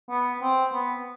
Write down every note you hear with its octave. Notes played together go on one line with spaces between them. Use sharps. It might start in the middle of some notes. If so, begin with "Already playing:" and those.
B3
C4
B3